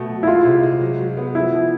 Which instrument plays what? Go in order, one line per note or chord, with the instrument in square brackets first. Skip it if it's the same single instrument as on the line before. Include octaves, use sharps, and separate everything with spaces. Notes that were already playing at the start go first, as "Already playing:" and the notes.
Already playing: [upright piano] B2 A3
F#3
[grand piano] E4
[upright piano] G#3 [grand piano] F4
[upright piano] C3
G#3
F#3
F#3
B3
[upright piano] F3 [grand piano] E4
[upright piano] F3